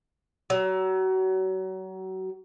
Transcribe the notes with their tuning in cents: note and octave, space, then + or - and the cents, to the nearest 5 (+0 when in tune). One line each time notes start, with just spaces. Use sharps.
F#3 +30